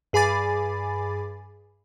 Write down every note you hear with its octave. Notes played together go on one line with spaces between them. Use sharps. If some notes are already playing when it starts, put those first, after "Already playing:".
G2 G#4 G#5 B5 D6 A6